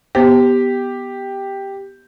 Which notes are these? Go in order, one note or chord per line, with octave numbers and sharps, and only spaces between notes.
B3 G4 C5